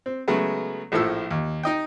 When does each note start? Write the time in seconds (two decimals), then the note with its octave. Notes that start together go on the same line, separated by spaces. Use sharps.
0.06 C4
0.28 C#3 F#3 G#3 A3 B3
0.92 A#1 A2 F3 A4 E6
1.31 D#2
1.63 D#4 D#5 G5